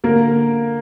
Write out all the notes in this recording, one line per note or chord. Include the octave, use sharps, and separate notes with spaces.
D3 A#3 A#4